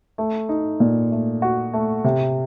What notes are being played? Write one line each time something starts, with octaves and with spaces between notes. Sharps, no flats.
A3
D#4
A#2
A3
F#4
A3
C3